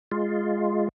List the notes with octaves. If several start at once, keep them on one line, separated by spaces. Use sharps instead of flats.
G#3 F4